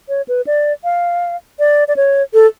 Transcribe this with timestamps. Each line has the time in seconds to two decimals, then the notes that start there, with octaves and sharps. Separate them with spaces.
0.09 C#5
0.28 B4
0.47 D5
0.84 F5
1.59 D5
1.88 D5
1.96 C#5
2.34 A4